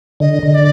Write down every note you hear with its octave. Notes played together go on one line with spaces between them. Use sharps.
D3 D#5
D3
D5